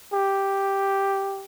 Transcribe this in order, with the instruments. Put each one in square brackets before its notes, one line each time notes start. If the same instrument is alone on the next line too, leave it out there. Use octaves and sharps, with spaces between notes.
[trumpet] G4